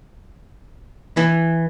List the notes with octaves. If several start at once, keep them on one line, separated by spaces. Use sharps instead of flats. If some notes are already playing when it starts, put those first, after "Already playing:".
E3